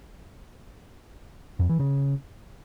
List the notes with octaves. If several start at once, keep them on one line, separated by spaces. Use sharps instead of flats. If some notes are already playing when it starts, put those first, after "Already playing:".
F2
E3
C#3